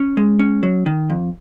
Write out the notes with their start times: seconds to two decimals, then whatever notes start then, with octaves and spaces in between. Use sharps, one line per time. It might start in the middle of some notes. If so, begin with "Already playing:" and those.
Already playing: C#4
0.17 G#3
0.39 C#4
0.63 F#3
0.86 D#3
1.10 F2